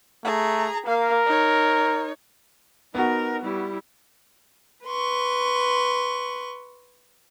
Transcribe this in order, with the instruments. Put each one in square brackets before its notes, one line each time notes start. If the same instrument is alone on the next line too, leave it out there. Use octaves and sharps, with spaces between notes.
[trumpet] A3 [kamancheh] G#4 A#5
[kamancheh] A#3 F5 [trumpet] A#4
[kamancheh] D#4 C#5
[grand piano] B3 F#4 [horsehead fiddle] D#4 A#4
[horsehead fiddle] G3 E4
[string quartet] B4 C6 C#6